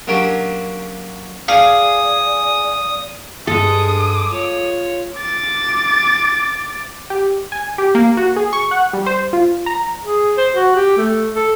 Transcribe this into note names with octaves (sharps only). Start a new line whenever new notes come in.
F#3 A#3 C#4 D4 G4
G#4 D5 F5 D6 D#6
G2 G#3 G#4 A4 D#6
F4 C#5
D6 A6
G4
G#5
G4
A#3
F#4
G#4
C#6
F#5
G3
C5
F4
A#5
G#4
C5
F#4
G4
A3
A4